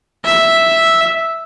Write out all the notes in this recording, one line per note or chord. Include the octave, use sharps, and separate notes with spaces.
E5